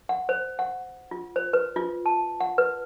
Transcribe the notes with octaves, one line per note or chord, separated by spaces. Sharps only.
F#5
C5
F#5
F4
C5
B4
F4
A5
F#5
B4